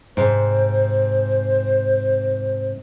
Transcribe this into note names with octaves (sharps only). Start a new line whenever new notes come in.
G#2 C3 C5